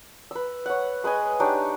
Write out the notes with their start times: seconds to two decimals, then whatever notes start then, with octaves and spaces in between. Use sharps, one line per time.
0.31 B4 E6
0.66 C#5 F#5
1.04 G#3 B4 D#5 G#5
1.40 D4 D#4 G4 C#5